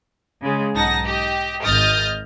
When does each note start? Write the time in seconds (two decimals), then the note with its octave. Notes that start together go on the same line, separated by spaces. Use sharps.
0.42 C#3 G#3
0.74 B1 G#2 D#4 F#5 A5 A#6
1.04 G4 D#5
1.64 G#1 D#5 D#6 F6 G6 A6